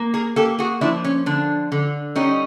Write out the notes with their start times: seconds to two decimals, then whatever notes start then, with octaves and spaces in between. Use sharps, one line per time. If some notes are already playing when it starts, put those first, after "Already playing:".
Already playing: A#3
0.14 G#4 A#4
0.36 A#3 G4 A4
0.59 F#4 G#4
0.81 F3 D4 E4
1.04 C#4
1.26 D3 D4
1.72 D3
2.15 G3 C#4 D#4